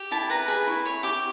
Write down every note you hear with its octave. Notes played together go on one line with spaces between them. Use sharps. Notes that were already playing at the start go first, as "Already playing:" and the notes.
Already playing: G4
E4 A5
B4 A#5
G#4 B5
E4 C#6
C#5 C#6
G4 D6